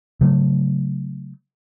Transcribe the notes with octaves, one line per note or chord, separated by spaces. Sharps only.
C#3 F#3 A3